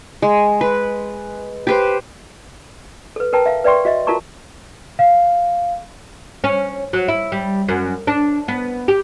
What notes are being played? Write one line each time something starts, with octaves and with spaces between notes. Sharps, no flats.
G#3
B4
G4 B4 C5
A4 B4
A#4 B4 G5 A5 A#5
E5 F5
B4 D5 E5 G5 C6 C#6
F#4 D#5 E5
F4 F#4 A#4 A5 A#5 C#6
F5
C#4
F#3
E4
G3
F#2
D4
B3
G4